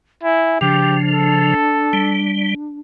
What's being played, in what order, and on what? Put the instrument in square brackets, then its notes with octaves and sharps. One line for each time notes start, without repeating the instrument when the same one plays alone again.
[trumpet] E4 [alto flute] G#5
[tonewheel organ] C#3 F3 [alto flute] D4 [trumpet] G4
[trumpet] A4
[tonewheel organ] G3